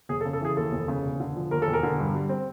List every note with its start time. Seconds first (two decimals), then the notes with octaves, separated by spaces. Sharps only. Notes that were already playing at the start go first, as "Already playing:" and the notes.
0.09 F1 G#4
0.21 A4
0.25 C#3
0.33 A4
0.41 E3 G#4
0.57 D#2 A4
0.72 F1
0.88 C#3
1.03 E1
1.20 D3
1.36 F3
1.51 D#2 A#4
1.62 E1 A4
1.73 A#4
1.83 D3
1.99 G2
2.15 G3
2.29 C4